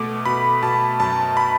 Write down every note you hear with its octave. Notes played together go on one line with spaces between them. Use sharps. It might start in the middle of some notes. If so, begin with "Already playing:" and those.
Already playing: B2 A3 D6
B2 B5
B2 A5
F#2 A5
B5